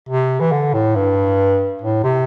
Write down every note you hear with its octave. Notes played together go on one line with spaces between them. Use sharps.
C3
E3
D3
A2
G2
A2
C3